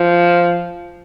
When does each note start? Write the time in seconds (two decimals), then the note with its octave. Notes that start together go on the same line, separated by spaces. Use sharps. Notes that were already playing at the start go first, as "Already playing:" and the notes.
Already playing: F3